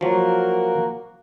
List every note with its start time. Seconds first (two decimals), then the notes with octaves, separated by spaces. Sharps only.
0.01 F3 F#3 A#3 F#4 A#4